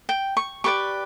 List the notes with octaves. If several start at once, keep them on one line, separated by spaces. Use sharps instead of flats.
G5
C#6
G4 B4 D5 C#6